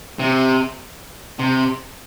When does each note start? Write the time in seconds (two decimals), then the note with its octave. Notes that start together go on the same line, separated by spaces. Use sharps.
0.19 C3
1.39 C3